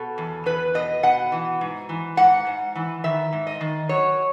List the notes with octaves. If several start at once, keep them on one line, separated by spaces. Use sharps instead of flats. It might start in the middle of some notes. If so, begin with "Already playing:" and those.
Already playing: B2 A4
E2
E2 B4
B2 D#5
B2 F#5
E3
G#2
E3
G#2 F#5
G#2
E3
D#3 E5
G#2
D#5
D#3
F#3 C#5